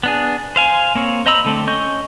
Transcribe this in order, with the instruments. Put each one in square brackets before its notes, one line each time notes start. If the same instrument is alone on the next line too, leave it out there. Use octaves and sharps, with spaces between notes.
[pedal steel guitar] B3 D4 G#4
C5 F5 G#5
A#3 C4 C#5
C5 D#5 A#5 B5 E6
D3 A3 C4
C#4 D#5 C#6 G6